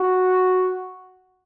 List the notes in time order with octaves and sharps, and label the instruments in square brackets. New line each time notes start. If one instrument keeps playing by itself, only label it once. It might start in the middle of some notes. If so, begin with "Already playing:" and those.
Already playing: [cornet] F#4